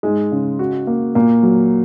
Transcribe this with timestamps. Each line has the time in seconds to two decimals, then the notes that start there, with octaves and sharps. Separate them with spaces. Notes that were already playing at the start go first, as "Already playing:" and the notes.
0.03 G#2 G#3
0.32 C#3
0.59 F#4
0.87 A#3
1.15 A#2 A#3
1.43 F#3